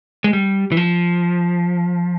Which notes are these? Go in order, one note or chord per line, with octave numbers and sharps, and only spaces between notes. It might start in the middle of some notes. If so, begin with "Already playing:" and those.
G#3
G3
E3
F3